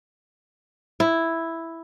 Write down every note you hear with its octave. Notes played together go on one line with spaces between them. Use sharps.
E4